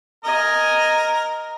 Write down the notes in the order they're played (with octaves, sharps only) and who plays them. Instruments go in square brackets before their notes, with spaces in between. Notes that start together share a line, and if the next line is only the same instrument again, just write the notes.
[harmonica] A#4 [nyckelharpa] D#5 G#5